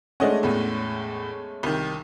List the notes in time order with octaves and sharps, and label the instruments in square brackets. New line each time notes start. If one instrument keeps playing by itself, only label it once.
[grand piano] G#3 A3 C#4 [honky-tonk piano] D4 D#5 F#5
[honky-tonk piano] E2 A2
C2 D#3